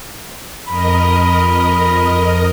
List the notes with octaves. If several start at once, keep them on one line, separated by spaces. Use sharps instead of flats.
F2 A#4 D#5 B5